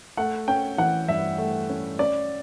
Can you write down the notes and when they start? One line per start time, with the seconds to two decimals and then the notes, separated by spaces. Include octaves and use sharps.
0.17 A3 F#5
0.48 C#4 G5
0.78 E3 F#5
1.08 G2 E5
1.38 A3
1.69 C#4
1.99 C#4 D5